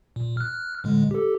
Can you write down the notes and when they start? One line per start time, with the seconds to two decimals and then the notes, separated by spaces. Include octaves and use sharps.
0.16 A#2
0.37 F6 F#6
0.84 A2 D3 G#3
1.11 G4 A4